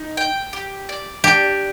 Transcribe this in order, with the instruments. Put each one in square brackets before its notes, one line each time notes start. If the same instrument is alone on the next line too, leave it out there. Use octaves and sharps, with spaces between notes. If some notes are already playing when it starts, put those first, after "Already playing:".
Already playing: [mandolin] D#4
G5
G4
D5
[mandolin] D4 [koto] G4